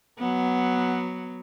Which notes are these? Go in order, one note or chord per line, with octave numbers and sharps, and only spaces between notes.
F#3 B3